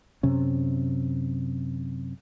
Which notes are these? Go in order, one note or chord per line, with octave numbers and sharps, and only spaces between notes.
F#2 C3 C#4